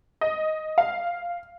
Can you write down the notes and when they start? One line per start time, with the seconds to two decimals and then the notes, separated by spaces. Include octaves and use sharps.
0.21 D#5
0.78 F5